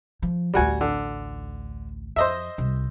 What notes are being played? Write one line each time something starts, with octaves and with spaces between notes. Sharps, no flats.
F3
A1 D2 G3 F#4 G#5
D3
F2 C5 D#5 E5
C2 G3